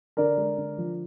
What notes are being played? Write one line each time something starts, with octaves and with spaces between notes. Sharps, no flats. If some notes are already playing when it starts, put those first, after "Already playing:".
D3 A#4 D5
G#3
D3
F3